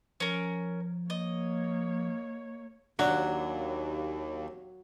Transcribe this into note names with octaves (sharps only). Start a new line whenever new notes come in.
F3 C#4 A#4
A#3 C#5 D#5
D#2 F#3 D4 F#5